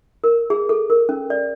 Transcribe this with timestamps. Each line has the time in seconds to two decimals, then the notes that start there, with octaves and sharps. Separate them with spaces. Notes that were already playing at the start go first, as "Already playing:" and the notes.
0.24 A#4
0.50 G#4
0.69 A4
0.90 A#4
1.09 C#4
1.30 D5